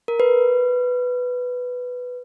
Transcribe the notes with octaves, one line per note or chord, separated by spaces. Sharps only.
A#4
B4